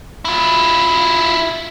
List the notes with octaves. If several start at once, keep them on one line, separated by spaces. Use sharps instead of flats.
E4 F4